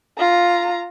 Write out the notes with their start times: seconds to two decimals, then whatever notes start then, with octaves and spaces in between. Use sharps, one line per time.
0.19 F4 A#5